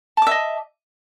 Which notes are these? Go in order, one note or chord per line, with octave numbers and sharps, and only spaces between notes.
D#5 E5 A5 D6